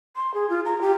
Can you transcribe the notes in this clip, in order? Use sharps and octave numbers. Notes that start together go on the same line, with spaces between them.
C6
G#4
F4
A#5
G4